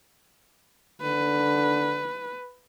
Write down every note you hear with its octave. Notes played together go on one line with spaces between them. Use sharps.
D3 B4